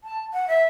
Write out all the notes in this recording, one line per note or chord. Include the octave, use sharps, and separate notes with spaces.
A5
F#5
E5